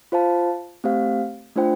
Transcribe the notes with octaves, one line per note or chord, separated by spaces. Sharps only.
F4 C5 F5 A5
A3 C4 G4 C5 F5
A3 D4 F4 C5 G5